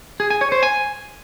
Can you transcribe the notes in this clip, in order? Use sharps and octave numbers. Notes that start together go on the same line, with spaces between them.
G#4
G#5
C#5
C5
G#5